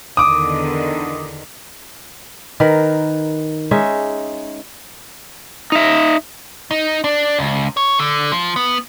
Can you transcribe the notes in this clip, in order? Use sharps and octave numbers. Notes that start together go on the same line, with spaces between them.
E2 D3 D#3 D6 D#6
D#3 A#4 B4
G#3 C#4 D#4 E5
D#4 E5
D#4
D4
C#2
C#5
D3
F3
B3